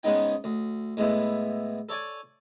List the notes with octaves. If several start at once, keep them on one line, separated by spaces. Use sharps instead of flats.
G#2 C#3 G#3 B3 D#4 G5
D2
A2 G#3 B3 E4
A4 C#5 D5 G#5